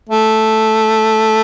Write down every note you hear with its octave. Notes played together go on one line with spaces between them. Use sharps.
A3